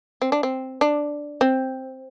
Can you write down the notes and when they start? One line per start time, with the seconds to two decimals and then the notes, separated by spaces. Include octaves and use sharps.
0.22 C4
0.32 D4
0.43 C4
0.81 D4
1.41 C4